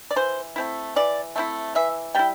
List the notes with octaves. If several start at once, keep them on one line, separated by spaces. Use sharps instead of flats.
D5
E3 C5
A3 C4 E4
E3 D5
A3 C4 E4
E3 E5
G3 E4 G5